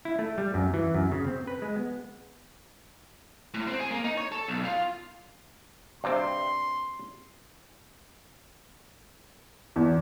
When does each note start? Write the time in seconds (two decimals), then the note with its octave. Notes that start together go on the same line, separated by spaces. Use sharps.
0.05 E4
0.19 A3
0.38 G3
0.54 F#2
0.74 E3
0.94 F#2
1.12 C#3
1.27 C4
1.47 B4
1.62 G#3
1.76 B3
3.54 A2
3.67 C4
3.80 G#4
3.91 A#3
4.04 D#4
4.17 C#5
4.32 A4
4.48 B1
4.65 F4
6.04 G2 C3 C4 C6
9.76 E2